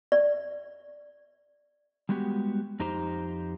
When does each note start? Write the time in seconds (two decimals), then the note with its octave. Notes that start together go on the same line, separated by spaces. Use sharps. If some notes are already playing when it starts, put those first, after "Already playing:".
0.12 D5
2.09 G3 G#3 B3 F#4 G4
2.80 F2 D#4 G4 C5 A#5